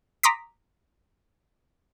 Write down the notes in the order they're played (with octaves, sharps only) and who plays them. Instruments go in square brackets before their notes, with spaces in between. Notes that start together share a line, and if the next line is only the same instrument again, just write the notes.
[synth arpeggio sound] A#5 C6 D6 D#6 B6